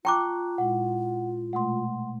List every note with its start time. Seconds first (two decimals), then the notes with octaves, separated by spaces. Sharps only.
0.05 F4 G5 A5 A#5 C#6 D6 F#6
0.58 A#2 G#3 E4 F#5
1.53 B2 G#3 A3 F#5 C6